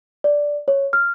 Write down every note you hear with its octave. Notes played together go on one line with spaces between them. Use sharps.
D5
C#5
F6